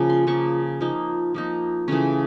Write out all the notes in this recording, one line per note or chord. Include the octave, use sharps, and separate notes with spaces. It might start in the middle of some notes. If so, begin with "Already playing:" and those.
Already playing: C#3 F3 A#3 F4
C6
C#3 F3 A#3 C#6
F3 A#3 D#4
F3 A#3 D#4
C#3 E3 A3 C#4